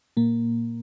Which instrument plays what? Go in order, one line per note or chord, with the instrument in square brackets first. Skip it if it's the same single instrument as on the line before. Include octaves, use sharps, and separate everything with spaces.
[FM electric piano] A#2 A#3